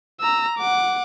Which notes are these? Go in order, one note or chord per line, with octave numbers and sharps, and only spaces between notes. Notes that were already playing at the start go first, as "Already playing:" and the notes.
A#5 E6
F#5 D6